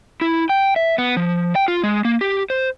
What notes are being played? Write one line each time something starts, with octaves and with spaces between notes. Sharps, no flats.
E4
G5
E5
B3
F3
G5
F4
G#3
A#3
G4
C5